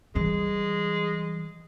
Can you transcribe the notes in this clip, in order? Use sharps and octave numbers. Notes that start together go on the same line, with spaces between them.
E3 G3 G#3